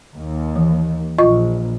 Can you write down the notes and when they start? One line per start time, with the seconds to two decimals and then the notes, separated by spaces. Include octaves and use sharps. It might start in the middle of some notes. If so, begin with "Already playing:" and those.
0.16 D#2
0.56 E3
1.18 A#1 F4 D#5 C#6